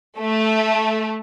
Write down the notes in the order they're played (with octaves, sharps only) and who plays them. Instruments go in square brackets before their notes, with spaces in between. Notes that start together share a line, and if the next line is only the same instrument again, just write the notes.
[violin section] A3